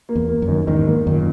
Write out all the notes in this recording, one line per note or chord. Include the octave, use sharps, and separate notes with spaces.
A#3
E2
A#3
F#2
D#3
E2 G#2 D#3
A#3
F#2 A#2 D#3